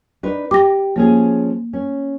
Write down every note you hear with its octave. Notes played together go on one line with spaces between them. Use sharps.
D4 D#4 B4
G4 D6 A#6
F3 A#3 C#4 G#4
C#4